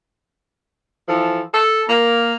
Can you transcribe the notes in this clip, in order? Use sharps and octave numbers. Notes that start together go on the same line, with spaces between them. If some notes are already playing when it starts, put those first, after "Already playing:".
E3 F3 A4
A4
A#3